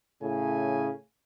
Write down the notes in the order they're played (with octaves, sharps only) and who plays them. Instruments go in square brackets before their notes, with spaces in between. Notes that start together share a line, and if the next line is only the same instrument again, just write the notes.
[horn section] A2 C#3 G#5